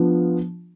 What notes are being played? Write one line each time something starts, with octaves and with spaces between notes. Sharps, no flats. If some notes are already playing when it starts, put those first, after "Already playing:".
Already playing: F3 B3 D4 F4